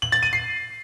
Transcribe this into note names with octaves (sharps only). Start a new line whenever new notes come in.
F#7
A6
D#7
C7